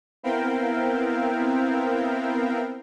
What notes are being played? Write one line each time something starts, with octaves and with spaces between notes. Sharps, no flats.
B3 C4 E4 A#4 F5 G5